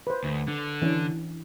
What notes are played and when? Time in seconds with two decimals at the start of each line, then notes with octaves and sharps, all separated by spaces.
0.07 B4 C5
0.24 D2
0.48 D3
0.82 E3 C#4 D4